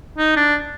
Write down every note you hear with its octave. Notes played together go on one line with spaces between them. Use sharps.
D#4
D4